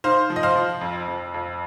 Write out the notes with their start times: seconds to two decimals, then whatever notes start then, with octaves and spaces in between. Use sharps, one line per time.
0.04 D#4 C5 F5
0.30 F3
0.36 D#5
0.43 C5 F5
0.56 F3
0.81 F2
1.08 F2
1.34 F2